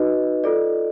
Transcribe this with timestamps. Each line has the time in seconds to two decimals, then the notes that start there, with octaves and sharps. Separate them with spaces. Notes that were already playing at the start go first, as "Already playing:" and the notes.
Already playing: D#4 F#4 B4 D#5
0.44 F4 A4 D5